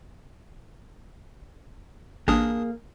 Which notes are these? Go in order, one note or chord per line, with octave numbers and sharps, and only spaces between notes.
A1 A#3 D4 G#4 D#6